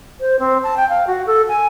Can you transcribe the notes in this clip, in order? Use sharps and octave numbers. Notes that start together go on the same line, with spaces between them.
C5
C4
A5
G5
F5
F#4
A4
G#5